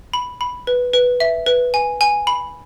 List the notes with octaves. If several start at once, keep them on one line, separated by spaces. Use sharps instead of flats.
B5
B5
B4
B4
E5
B4
G#5
G#5
B5